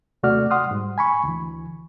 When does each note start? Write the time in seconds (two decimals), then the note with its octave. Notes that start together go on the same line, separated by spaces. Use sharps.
0.23 D#2 C3 A3 F#4 D5 F6
0.51 F#5 C6 D#6 F6
0.67 G#2 G3
0.98 G#5 B5 C#6
1.23 D2 E3